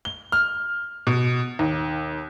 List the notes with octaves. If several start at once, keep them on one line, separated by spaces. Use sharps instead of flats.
G7
F6
B2
D#2